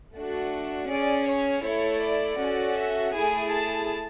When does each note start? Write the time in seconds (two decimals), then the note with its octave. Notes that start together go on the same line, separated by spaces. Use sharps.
0.15 A3 D4 F#4
0.89 C#4 G#4 D5
1.27 C#5
1.64 A3 E4 A4 C#5
2.02 D5
2.39 C#4 F#4 A4
2.77 E5
3.13 A3 E4 G#4 G#5
3.51 A5